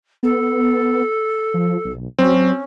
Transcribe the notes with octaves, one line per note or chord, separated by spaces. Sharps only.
B3 A4
F3
B1
F#3 C4 C#4